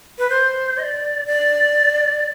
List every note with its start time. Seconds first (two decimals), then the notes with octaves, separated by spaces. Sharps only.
0.19 B4
0.29 C5
0.78 D#5
0.82 D5
1.27 D5